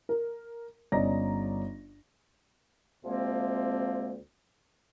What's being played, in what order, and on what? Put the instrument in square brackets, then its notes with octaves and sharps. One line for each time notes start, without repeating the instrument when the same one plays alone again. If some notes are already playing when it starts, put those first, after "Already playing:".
[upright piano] A#4
G1 C#4 D5 D#5 A#5 A#6
[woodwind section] D2 C3 F3 G#3 A#3 C4